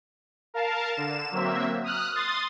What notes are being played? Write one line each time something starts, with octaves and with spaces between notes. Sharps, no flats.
A#4 F5 A5
D3 E7
F#3 A#3 C4 E5
D#6 F6 F#6
C6 D#6 A6